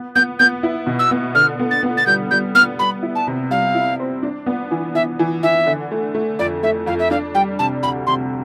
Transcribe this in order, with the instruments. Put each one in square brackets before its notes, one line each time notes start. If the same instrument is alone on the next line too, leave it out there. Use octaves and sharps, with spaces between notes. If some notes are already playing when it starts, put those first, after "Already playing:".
Already playing: [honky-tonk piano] B3
[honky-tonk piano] B3 [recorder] G6
[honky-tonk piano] B3 [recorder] G6
[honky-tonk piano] E4
B2
[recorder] E6
[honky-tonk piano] B3
[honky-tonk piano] D3 [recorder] F6
[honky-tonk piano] B3
[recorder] A6
[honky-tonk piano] B3
[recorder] A6
[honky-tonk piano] G3 [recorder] G6
[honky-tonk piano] G3 [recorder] G6
[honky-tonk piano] B3 [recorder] F6
[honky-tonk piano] G3 [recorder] B5
[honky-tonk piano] E4
[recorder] A5
[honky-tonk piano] C3
[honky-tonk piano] G3 [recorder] F5
[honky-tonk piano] E4
C4
D4
B3
E3
[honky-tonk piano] E3 [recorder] E5
[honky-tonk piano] E3
[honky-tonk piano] E3 [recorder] E5
[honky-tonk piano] D3
A3
A3
[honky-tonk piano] F2 [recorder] D5
[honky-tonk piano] A3 [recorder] E5
[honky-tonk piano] F2 [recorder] F5
[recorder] E5
[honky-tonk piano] D4 [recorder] F5
[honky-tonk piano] G3 [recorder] G5
[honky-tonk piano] C3 [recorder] A5
[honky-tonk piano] D2 [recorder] B5
[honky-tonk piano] C3 [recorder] C6